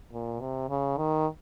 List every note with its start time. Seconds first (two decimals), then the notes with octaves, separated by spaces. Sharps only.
0.12 A#2
0.40 C3
0.69 C#3
0.97 D#3